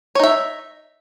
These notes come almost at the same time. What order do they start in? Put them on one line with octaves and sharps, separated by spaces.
C#5 D#4 E5